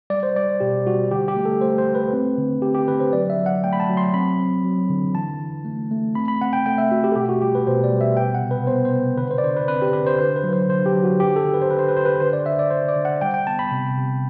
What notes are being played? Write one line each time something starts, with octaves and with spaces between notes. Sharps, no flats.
G3 D5
C5
G3 D5
B2 G4
G3 F#4
D3 G4
G4
A3
A4
A3 C5
C5
A3
B4
C4
D3
C4 G4
G4
D3 B4
C5
F#3 D5
E5
F#3
F#5
A3 G5
B5
A5
F#3
C6
C4 B5
C4
F#3
D3
E3 A5
E3
A3
A3
C4 B5
B5
C4 F#5
G5
A3 G5
E5
A3 F#4
G4
A4
B2 G4
F#4
G3 G4
B4
B2 C5
D5
G3
E5
B3 G5
F#5
C3
B4
B3 C5
C5
C3
D3 B4
C5
D5
D3 C5
B4
C4 B4
G4
D3 B4
C5
D3 C5
B4
F#3
C5
D3 C5
G4
F#3
F#4
D3 G4
A4
D3
B4
C5
D3 B4
C5
B4
D3 C5
B4
D3 C5
D5
D3 E5
D5
D3 C5
D5
D3
F#5
G3 G5
G5
B3 A5
B5
C3
C3